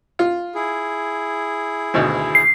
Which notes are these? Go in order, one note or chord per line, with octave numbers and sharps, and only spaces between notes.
F4
E4 G#4
G#1 D2 B2
C7